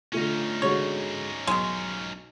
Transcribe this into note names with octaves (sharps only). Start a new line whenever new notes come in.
D3 A3 C#4 D#4 F4
D3 G#3 F#4 C#5
B1 D#3 G#3